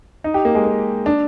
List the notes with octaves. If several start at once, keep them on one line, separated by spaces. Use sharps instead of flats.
D#4
G4
A#3
G#3
A#3
D4